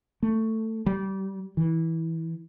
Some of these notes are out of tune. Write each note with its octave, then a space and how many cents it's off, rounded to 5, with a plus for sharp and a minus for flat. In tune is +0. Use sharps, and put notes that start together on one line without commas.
A3 +15
G3 -25
E3 -15